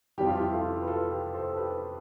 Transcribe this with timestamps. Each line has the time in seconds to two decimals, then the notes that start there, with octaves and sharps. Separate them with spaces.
0.18 F2 E3 G3 G4
0.27 F4
0.36 E4 G4
0.53 F4 A4
0.82 B4
0.88 F4 A4
1.11 G4 B4
1.34 A4 C5
1.51 A4
1.57 G4 B4